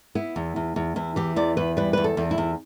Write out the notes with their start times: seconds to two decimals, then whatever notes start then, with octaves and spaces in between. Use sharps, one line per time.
0.15 B3 E4
0.36 E2
0.56 E2
0.76 E2
0.96 E2 E4
1.16 E3 G4
1.36 E2 D5
1.57 E2 B4
1.77 G3 B4
1.93 E2 B4
2.04 A4
2.17 E2
2.31 E4
2.38 E2